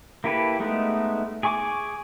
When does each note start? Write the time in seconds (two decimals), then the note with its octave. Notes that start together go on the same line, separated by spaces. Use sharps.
0.24 A#3 E4 G4 A4 B4
0.60 G#3 A3 B3 D#4
1.43 G#4 G#5 C#6 D6